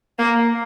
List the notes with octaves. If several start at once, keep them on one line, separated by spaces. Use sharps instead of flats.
A#3